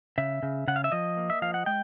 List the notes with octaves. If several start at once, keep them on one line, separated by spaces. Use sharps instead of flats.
C#3 E5
C#3
C#3 F#5
F5
E5
F3 D#5
A#3
E5
F3 F5
F#5
G#3 G5